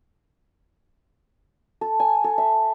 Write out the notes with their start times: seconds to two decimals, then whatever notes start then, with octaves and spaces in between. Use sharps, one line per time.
1.81 A4
2.00 G#5
2.24 A4
2.38 E5